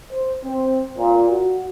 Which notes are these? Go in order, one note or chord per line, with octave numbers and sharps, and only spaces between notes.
C5
C4
A#2
F#4